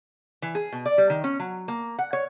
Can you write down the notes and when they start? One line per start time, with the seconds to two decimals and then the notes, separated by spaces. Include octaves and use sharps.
0.42 E3
0.55 G#4
0.73 B2
0.86 D5
0.98 G3
1.10 D#3
1.24 C#4
1.40 F#3
1.68 A#3
1.99 F#5
2.13 C#5